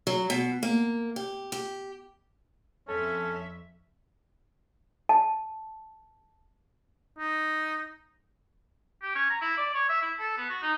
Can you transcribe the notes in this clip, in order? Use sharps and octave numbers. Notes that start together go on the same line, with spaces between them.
F#3
B2
A#3
G4
G4
F2 C#4 A4 E5
A5
D#4
G4
C#4
A#5
E4
D5
C#5
E5
E4
A4
B3
F#4
D#4